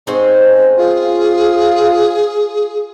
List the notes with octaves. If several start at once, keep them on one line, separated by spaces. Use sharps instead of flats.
G#2 C4 C#4 C5
F4 G#4